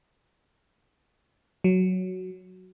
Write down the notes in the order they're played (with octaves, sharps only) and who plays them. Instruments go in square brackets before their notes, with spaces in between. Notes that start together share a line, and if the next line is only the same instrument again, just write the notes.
[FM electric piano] F#3